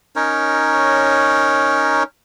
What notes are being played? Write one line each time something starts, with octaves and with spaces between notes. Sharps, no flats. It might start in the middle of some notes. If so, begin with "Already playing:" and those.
C#4 D#4 A#4 C#5